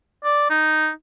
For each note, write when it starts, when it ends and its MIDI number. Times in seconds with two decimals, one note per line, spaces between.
0.24 0.46 74
0.50 0.90 63